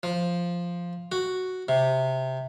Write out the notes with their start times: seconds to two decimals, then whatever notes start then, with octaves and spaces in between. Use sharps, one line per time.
0.03 F3
1.12 F#4
1.69 C3